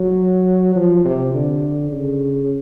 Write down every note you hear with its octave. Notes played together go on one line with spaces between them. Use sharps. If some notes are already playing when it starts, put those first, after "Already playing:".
Already playing: F#3
F3
C3
D3
C#3